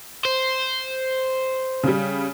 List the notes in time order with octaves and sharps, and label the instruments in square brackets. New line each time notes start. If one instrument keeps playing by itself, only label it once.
[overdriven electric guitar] C5
[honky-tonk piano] C#3 G3